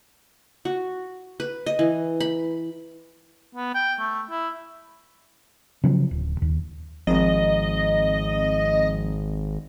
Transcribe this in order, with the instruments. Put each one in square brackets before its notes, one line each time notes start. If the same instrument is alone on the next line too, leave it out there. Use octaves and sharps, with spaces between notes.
[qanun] F#4
B4
D#5
E3
B5
[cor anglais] B3
G5
A3
E4
[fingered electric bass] C#3 F3 F#3
D1
D#2
[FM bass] G#1 [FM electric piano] F3 C4 A#5 [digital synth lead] D#5